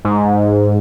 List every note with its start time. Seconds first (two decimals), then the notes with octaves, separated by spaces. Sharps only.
0.05 G#2